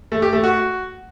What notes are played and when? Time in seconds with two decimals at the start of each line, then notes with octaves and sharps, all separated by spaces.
0.12 A3
0.22 G4
0.33 A3
0.44 F#4